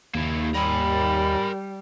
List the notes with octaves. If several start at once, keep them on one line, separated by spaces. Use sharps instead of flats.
D#2 A#3 E4
G3 A#4 G#5 B5